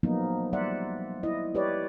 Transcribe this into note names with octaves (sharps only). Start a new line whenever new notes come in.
F3 F#3 A#3 B3 D#4
G3 C5 D5 E5 F#5
E4 D#5
G4 B4 C#5 D5